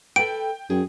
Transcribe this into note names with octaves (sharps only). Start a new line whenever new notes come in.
A4 B4 G5 D7
F#2 G#4